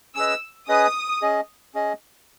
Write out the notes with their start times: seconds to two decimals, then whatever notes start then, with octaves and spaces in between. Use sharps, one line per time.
0.16 C#4 G#4 B4 D#5 E6
0.68 C#4 G#4 B4 D#5 D#6
1.22 C#4 G#4 D#5
1.75 C#4 G#4 D#5